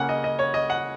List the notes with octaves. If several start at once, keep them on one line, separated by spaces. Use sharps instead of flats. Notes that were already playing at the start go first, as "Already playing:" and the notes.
Already playing: C#3 A#3 C#4 F#5 G#5
D#5
D#5
C#5
D#5
F#5